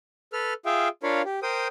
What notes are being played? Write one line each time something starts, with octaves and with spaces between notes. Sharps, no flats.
A4 B4 F6
F4 G#4 E5 F5 G5
D4 F4 A#4 C#5 F5 B5
G4
A#4 C5 G5 D#6